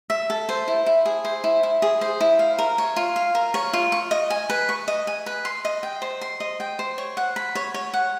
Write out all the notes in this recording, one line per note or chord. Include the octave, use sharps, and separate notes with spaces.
E5
A4
C5
E4
E4
G#4
C5
E4
E4
G#4
C5
E4
F5
A#4
C#5
F4
F5
A#4
C#5
F4
C#6
D#5
G#5
B4
C#6
D#5
G#5
B4
C6
D#5
G5
C5
C6
D#5
G5
C5
C#5
F#5
B5
C#5
C#5
F#5